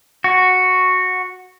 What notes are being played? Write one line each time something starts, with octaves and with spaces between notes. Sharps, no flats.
F#4